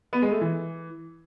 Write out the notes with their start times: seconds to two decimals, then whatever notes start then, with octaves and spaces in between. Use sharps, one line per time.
0.13 B3
0.22 G#3
0.32 A3
0.41 E3